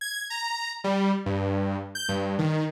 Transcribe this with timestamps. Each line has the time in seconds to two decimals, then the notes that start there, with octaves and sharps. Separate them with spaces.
0.01 G#6
0.30 A#5
0.84 G3
1.26 G2
1.95 G6
2.09 G2
2.39 D#3